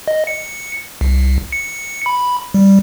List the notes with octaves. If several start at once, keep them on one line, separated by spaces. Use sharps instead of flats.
D#5
C#7
C2
C#7
B5
G3